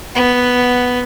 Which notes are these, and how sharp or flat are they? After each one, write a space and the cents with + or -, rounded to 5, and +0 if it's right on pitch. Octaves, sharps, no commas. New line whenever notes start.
B3 +0 F#5 +0